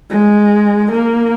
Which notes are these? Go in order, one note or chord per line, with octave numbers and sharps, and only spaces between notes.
G#3
A#3